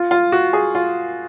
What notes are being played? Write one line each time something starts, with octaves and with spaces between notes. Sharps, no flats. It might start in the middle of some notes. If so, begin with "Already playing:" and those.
Already playing: F4
F4
F#4
G#4
F4